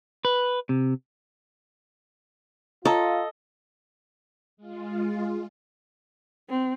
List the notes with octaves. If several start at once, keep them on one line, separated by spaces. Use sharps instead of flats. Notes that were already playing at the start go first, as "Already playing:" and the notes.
B4
C3
F4 A4 C#5 D#5 A#5
G#3 F4
C4